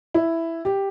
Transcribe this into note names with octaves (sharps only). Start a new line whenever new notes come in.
E4
G4